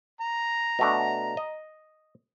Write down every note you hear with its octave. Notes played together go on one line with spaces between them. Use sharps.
A#5
B2 A3 D4
D#5